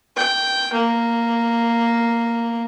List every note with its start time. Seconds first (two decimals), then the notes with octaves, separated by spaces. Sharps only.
0.16 G5
0.73 A#3